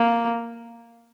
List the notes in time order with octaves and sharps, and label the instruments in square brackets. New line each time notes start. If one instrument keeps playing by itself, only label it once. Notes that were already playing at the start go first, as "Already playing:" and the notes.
Already playing: [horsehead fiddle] A#3